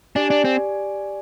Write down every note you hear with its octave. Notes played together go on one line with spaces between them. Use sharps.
D4 G4 D5 G#5
D4
C4